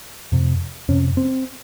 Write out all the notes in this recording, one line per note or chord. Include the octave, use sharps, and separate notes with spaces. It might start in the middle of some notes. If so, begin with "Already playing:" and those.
F2 C3
F2 C3 C#4
C4